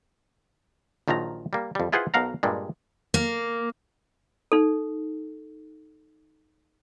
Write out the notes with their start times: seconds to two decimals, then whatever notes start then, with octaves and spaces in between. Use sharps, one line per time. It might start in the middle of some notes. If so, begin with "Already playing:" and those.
1.08 A#1 D#3 F3 F#3 A#5
1.53 G3 A#3
1.75 F2 G3
1.92 E4 F4 G#4 B4 C5 F#5
2.14 B1 B2 A#4 F5 F#5 A#5
2.43 G2 A#2 G3 G#3
3.14 A#3
4.52 D#4 A4